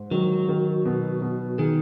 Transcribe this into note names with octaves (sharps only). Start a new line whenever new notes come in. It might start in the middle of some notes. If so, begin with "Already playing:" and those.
Already playing: G#2
D#3 F#3
D#3
B2
B2
D#3 G#4